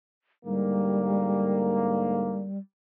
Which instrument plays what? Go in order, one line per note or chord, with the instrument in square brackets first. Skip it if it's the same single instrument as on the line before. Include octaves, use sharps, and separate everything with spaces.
[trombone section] G#2 D3 A#3 [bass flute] G3